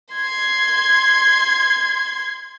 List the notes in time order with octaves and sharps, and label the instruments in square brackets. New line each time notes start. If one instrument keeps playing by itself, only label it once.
[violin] C6 G#6